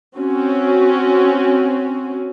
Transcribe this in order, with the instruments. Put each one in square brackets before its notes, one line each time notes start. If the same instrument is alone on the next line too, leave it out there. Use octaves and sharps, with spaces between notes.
[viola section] C4 C#4 F#4